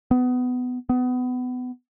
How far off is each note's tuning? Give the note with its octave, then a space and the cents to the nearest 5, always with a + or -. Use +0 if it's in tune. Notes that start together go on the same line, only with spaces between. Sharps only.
B3 +20
B3 +25